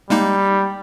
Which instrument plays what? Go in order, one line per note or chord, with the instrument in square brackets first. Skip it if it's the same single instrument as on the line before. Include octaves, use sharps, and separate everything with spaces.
[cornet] G3 [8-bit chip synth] G#3 A#3 D#4